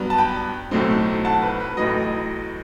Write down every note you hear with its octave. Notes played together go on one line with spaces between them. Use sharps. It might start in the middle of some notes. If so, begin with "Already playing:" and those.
Already playing: G2 F#3 B3
A5
G5 B5
B1 A2 F#3 A3 C4
F#5 A5
B4
B4
A1 A2 F#3 B4 D#5